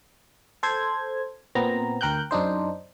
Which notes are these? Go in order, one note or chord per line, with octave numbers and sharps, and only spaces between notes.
A4 C5 G#6
A#2 B3 C4 A#5
D2 A#4 G5 F#6 G6
F#2 D4 D#4 C5